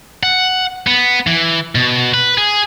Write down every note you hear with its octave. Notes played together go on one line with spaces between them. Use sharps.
F#5
B3
E3
B2
B4
G#4